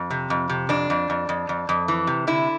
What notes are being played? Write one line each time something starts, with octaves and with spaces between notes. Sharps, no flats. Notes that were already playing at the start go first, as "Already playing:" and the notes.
Already playing: F2
C3
F2
C3
F2 D4
F2
F2
F2
F2
F2
E3
C3
D3 E4